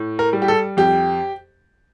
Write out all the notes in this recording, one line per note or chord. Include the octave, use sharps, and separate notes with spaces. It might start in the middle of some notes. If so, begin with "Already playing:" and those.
Already playing: A2
A#4
G3
G4
A4
F2 G4